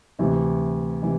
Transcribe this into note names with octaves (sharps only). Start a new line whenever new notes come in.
D2 C3 E3
C3 E3